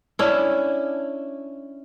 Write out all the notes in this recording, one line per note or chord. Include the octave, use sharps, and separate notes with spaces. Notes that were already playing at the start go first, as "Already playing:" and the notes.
C#4 D4 E4